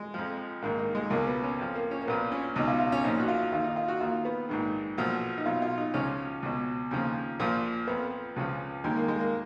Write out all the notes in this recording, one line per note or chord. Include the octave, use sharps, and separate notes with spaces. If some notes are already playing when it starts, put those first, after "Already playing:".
Already playing: G#3
F2 F3
A#1 G#2 D#3 A#3
A#3
G#3
C#2 B2 A#3
B3
C#4
F2 F3
A#3
C#4
A#3
A#1 A#2 F3 B3
C#4
C#2 B2 D#4
F4
F4
C#4
A#1 A#2 F3 D#4
F#4
F4
D#2 D#3 F4
D#4
F4
F#4
D#2 D#3 F4
B3
A#1 G#2 D#3
B1 A#2 F3
D#4
B1 B2 F4
F4
D#4
C#2 C#3 F3 C#4
C#2 B2
D#2 C#3 F3
A#1 A#2 F3
F2 F3 B3
C#2 C#3 F3
D#2 D#3 G#3
A#3
G#3
A#3